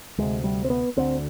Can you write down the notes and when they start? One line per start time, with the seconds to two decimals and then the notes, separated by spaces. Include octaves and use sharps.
0.18 D2 C3 G#3
0.44 G3
0.64 C4
0.70 B3
0.97 D2 D3 C4